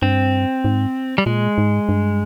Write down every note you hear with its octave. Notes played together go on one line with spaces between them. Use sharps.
G2 C4
G#2
G3
A#2 G#3
G#2
G2